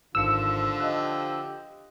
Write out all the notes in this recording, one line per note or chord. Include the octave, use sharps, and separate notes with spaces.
G#1 D3 F3 F4 E6 C#7
G4 D#5 F5 F#6